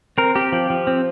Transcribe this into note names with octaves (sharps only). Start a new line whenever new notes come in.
C4 A#4
C4 G4
F3
F3
C4